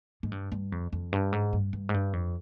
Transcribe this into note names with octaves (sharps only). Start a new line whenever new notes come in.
G#2
G2
G2
F2
F2
G2
G#2
G2
G2
G#2
G2
F2